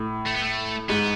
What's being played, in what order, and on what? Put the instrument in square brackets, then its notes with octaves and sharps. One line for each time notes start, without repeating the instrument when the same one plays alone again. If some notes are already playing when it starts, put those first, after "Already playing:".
Already playing: [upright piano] A2
[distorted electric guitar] A3
B3
A3
[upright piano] G#2 [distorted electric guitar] B3